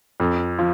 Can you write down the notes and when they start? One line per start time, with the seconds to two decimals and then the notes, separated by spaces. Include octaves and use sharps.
0.20 F2
0.59 F3